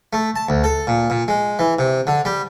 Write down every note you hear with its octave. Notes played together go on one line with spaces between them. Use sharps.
A3
A5
D2
A4
A#2
A#2
G#3
E3
C3
D3
G3